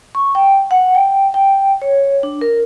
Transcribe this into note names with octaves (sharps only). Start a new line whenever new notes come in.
C#6
G5
F#5
G5
G5
C#5
D4
A#4